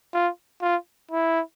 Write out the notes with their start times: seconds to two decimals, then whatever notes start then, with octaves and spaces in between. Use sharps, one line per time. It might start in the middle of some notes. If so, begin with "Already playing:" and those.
0.14 F4
0.62 F4
1.11 E4